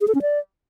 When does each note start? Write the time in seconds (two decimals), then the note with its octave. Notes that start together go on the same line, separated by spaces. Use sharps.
0.01 G#4
0.08 A4
0.15 C#4
0.22 D5